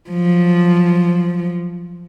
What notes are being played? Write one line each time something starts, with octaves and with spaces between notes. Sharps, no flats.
F3 F#3